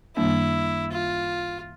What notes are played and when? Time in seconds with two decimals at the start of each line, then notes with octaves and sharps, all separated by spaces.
0.16 F#2 D#3 G3 A#3 D4 E4
0.92 F4